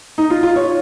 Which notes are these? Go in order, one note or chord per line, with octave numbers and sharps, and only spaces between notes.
D#4
F4
F4
C#5